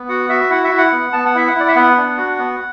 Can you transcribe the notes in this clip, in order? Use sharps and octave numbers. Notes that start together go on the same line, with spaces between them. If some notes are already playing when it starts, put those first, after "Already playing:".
Already playing: B3
F#4 F#5
F#4 E5
E4 F#5
E5
E4
F#5
B3
B3 A5
F#5
E4 E5
F#5
E4
D5
E5
B3 F#5
D4
F#4
B3